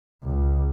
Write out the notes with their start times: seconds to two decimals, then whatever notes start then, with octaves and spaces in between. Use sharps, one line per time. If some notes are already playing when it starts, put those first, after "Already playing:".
0.24 C#2